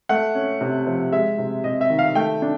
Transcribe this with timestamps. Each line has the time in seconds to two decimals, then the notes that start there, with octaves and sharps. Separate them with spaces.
0.09 A3 F#5
0.35 C#4
0.61 C3
0.87 F3
1.12 G#3 E5
1.38 C3
1.64 C3 D#5
1.81 E5
1.90 D#3
1.99 F5
2.15 A3 G5
2.42 D4